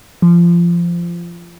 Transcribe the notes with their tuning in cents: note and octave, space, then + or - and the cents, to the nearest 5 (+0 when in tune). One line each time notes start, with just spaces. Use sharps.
F3 -20